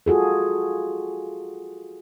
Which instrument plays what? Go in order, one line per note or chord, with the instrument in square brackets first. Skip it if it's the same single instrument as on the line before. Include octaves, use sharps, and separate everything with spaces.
[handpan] F4 F#4 G#4 A4